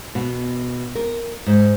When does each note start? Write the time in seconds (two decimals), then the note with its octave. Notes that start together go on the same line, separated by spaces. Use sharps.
0.15 B2
0.95 A#4
1.46 G#2